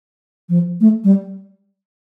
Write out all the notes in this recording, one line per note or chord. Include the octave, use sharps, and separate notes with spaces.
F3
A3
G3